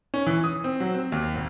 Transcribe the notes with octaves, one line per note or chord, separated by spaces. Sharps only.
C#4
E3
D#6
C4
F#3
C4
D#2
G#1